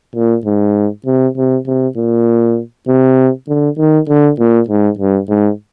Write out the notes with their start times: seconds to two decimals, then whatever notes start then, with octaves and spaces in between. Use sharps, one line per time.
0.15 A#2
0.45 G#2
1.06 C3
1.37 C3
1.67 C3
1.96 A#2
2.88 C3
3.48 D3
3.78 D#3
4.09 D3
4.39 A#2
4.68 G#2
4.99 G2
5.29 G#2